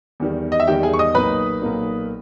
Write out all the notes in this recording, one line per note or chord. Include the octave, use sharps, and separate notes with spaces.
E2 D#3 G3
D#5
E5
E2 D#3 G3 G4 G5
G#4 G#5
C#6
D#5 D#6
B1 A#2 A#3 D#4 B4 B5
B1 A#2 A#3 D#4